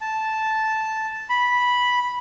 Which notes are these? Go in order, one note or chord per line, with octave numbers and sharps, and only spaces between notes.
A5
B5